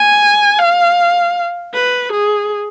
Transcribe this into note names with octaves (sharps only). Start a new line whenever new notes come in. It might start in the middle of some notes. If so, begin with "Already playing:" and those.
Already playing: G#5
F5
B4
G#4